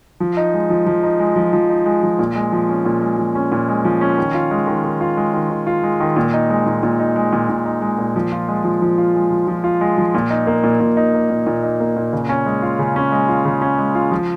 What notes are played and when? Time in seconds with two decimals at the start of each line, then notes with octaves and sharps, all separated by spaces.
0.20 F3
0.37 D#4
0.54 G#3
0.70 F3
0.87 F3
1.03 D#4
1.20 G#3
1.36 F3
1.53 F3
1.69 D#4
1.86 G#3
2.03 F3
2.19 A#2
2.36 G#3
2.52 F3
2.69 C#4
2.85 A#2
3.01 G#3
3.18 F3
3.35 C#4
3.52 A#2
3.68 G#3
3.85 F3
4.01 C#4
4.18 D#3
4.34 F4
4.51 G#3
4.67 D#3
4.84 D#3
5.01 F4
5.17 G#3
5.34 D#3
5.51 D#3
5.67 F4
5.83 G#3
6.00 D#3
6.16 A#2
6.33 D#4
6.50 G#3
6.66 A#2
6.83 A#2
7.00 D#4
7.16 G#3
7.33 A#2
7.49 A#2
7.65 D#4
7.82 G#3
7.98 A#2
8.16 F3
8.32 F4
8.48 G#3
8.64 F3
8.82 F3
8.98 F4
9.15 G#3
9.31 F3
9.48 F3
9.64 F4
9.81 G#3
9.98 F3
10.15 A#2
10.30 D#4
10.47 A#3
10.64 A#2
10.80 A#2
10.97 D#4
11.14 A#3
11.30 A#2
11.47 A#2
11.63 D#4
11.80 A#3
11.96 A#2
12.13 C#3
12.29 C#4
12.46 G#3
12.62 F4
12.79 C#3
12.96 C#4
13.12 G#3
13.29 F4
13.45 C#3
13.62 C#4
13.79 G#3
13.95 F4
14.12 F3